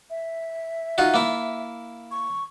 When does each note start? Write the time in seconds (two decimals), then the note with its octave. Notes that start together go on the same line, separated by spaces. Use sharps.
0.10 E5
0.98 D#4 F4 F#4
1.14 A#3 E4
2.11 C#6